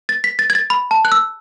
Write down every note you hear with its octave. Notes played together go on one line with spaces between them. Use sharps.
A6
B6
A6
G#6
A6
B5
A5
F#6
E6